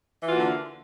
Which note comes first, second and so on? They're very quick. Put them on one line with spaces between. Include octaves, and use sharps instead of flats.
E3 F4 F#4 A#3 D3